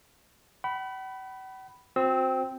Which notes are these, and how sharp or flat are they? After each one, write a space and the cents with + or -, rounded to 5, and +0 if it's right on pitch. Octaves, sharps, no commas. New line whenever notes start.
F#5 +45 B5 +0
C4 +0 F#4 -35 E6 -35